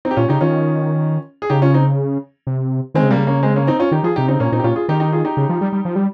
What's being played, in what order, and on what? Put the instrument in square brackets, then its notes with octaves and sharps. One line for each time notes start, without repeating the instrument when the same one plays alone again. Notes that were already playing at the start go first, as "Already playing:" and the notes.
[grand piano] C4 D#4
G4
[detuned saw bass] A#2 [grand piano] C#4 F4
[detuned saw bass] C#3 [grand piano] D#4 G4
[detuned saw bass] D#3 [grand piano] C#4 F4
[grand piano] G#4
[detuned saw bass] C#3 [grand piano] D#4 G4
[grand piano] C#4 F4
C4 D#4
[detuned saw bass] C3
[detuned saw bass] D#3 [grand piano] G#3 C4
[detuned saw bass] C#3
[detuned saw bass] C3 [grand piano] G3 A#3
[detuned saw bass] C#3
[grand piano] A#3 C#4
G#3 C4
A#3 C#4
C4 D#4
C#4 F4
[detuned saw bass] D#3 [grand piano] D#4 G4
[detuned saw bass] F3 [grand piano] F4 G#4
[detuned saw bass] C3 [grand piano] D#4 G4
[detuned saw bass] C#3 [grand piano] C4 D#4
[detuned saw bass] A#2 [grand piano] A#3 C#4
[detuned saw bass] A#2 [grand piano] C4 D#4
[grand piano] G4
[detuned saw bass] A#2 [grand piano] C#4 F4
[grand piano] F4 G#4
[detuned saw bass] D#3 [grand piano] D#4 G4
[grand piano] D#4 G4
F4 G#4
D#4 G4
[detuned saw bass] C#3
F3
G3
G3
F3
G3